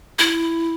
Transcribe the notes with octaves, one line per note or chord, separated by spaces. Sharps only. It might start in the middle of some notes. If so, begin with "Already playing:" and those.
E4